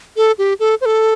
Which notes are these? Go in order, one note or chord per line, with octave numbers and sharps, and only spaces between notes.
A4
G4
A4
C5
A4